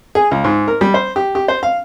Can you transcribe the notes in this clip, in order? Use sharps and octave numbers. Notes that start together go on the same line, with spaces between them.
G#4
C#2
G#2
A#4
G3
C5
G4
G4
C5
F5